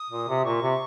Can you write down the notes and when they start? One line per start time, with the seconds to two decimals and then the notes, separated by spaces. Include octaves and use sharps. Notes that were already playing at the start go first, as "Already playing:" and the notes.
Already playing: D#6
0.10 A#2
0.29 C3
0.45 A#2 C#6
0.62 C3